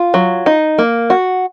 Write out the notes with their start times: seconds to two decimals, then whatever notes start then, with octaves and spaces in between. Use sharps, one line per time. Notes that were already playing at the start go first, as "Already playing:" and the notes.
Already playing: F4
0.14 F#3
0.46 D#4
0.78 A#3
1.10 F#4